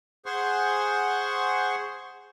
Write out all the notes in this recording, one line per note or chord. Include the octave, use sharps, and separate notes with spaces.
G#4 C5 F#5 C6 C#6